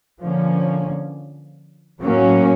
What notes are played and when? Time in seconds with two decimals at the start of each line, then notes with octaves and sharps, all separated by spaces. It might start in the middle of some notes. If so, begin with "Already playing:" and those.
0.22 D3 F3 A#3 C#4
2.01 A2 F#3 A#3 C#4